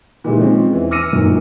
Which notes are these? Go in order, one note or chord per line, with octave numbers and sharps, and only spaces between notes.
A#2 D#3 E3 G3 G#3
D#3 F3 G#3 C4 C#4
E2 E3
D6 E6 F6 A#6 C#7 D#7
G1 F#2 A#2 D#3